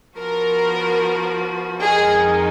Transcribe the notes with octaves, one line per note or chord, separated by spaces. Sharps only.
F3 B3 F#4 A#4
F2 D#3 G#3 D#4 G#4